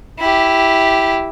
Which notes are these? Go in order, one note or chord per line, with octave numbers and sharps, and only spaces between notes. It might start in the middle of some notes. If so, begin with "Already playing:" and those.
E4 G4